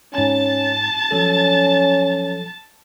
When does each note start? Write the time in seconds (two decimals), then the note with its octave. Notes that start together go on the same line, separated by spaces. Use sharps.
0.14 G#2 C#4 G#5 A5 A6
1.11 F3 F#3 C#4 A4